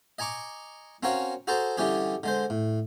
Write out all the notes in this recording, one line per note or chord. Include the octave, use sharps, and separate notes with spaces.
D#5 G#5 A#5 C#6 D6
C4 C#4 F#4 A#4 C#5 F5
F#4 G#4 A4 C5 A5 A#5
D3 E3 G3 C#4 G4 G#4
D3 G#3 C5
A2